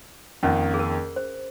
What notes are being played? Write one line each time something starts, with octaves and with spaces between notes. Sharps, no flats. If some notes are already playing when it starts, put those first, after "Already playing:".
F2 D#3 A#3 C#4 F4
G#4
A#4
C5